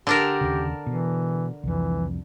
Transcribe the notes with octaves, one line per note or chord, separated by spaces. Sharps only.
D3 D4 G4 A#4
D#2 C#3
B2 E3
C2 F2 E3